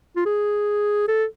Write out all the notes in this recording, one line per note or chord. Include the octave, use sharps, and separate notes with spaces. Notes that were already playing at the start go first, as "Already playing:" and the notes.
F4
G#4
A4